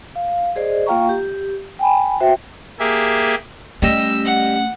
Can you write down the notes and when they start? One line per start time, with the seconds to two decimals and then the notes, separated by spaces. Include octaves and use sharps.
0.16 F5
0.56 G#4 C5 D5 D#5
0.87 A#3 F4 F5 G5 A#5 C#6
1.09 G4
1.79 G5 G#5 B5
2.20 F#4 C5 E5 G5
2.79 A#3 G4 G#4 E5
3.82 G3 A3 C#4 D#5 E6
4.25 F#5